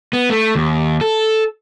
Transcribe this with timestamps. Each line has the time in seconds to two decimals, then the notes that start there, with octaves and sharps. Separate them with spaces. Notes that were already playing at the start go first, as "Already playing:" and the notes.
0.13 B3
0.30 A3
0.55 D#2
1.01 A4